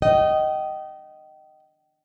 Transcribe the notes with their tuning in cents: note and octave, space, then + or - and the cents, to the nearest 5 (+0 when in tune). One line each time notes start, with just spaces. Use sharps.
D#5 +0 G5 -35